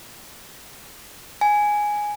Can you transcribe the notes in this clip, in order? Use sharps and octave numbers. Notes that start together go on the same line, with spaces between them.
G#5